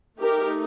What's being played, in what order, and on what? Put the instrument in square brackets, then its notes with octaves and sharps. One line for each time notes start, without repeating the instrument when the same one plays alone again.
[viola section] A3 D#4 G4 A#4